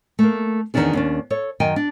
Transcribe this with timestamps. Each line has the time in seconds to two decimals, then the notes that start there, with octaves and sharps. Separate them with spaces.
0.19 A3 A#3
0.74 E2 D#3 G3 C#4 D4 G#4
0.93 D#2 C#4 D4
1.30 A4 C#5
1.60 F#2 D#3 D#5 G5 G#5
1.76 D4